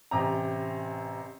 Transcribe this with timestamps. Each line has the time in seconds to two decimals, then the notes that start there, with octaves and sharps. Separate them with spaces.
0.11 A1 C3 A#5